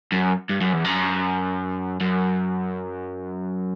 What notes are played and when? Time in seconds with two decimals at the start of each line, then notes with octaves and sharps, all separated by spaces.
0.12 F#2
0.49 G2
0.61 F#2
0.73 E2
0.85 F#2
2.01 F#2